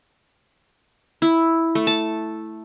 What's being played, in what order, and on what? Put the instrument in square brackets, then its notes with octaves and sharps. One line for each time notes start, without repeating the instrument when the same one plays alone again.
[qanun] E4
A3
A5